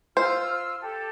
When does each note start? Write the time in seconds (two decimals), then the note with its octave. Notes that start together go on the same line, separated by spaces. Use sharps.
0.17 F4 C5 E6 F6
0.80 G4 A4